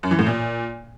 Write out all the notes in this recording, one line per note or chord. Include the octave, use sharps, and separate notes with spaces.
F#2
E3
A2
A#2